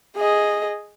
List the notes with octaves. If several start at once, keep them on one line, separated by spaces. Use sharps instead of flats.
G#4 D#5